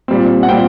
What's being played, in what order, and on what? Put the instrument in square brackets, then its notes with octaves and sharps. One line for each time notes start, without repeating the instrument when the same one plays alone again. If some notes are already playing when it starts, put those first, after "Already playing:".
[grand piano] A#2 G3 C4
F#5
A#2 G3 C4 G5